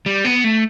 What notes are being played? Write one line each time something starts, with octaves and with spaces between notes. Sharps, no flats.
G3
B3
A3